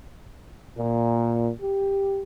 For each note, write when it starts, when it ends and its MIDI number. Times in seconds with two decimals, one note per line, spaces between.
0.77 1.50 46
1.62 2.23 67